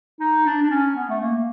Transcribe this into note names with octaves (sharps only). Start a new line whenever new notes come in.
D#4
D4
D4
C#4
B3
A3
A#3